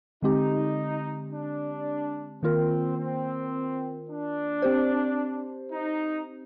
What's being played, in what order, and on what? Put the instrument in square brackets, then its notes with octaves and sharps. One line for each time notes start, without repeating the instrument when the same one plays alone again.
[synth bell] D3 G#3 C4 G4 [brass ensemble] D#4
[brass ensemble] D4
[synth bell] D#3 A#3 F4 A#4 [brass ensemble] C4
[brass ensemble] C4
D4
[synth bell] C4 G4 C5
[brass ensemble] D#4